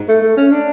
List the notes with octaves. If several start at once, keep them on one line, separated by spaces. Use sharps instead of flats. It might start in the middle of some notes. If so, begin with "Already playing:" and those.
Already playing: G#2
A3
A3
C#4
D4